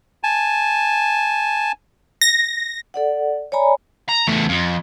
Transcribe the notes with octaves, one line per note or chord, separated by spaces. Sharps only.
G#5 A5
A#6
A4 D5 F#5
C#5 D5 G#5 A#5 B5
A#5
E2 A3
F2